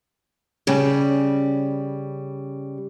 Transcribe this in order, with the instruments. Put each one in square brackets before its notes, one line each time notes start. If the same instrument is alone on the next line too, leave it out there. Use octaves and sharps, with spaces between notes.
[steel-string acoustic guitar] C#3 G3